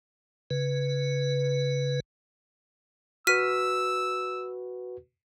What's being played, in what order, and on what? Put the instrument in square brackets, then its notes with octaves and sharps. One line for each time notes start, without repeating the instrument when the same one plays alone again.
[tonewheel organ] C#3 B4
[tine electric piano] F#4 B4 [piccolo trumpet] E6 [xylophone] F6 B6 D#7